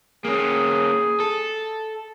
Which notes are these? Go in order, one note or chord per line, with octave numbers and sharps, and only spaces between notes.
A#3 C#4 G#4
A4